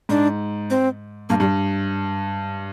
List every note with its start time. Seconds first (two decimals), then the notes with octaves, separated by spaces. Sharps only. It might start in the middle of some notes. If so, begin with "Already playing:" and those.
0.09 G#2 D4
0.70 C4
1.29 G2 A#3
1.40 G2 G3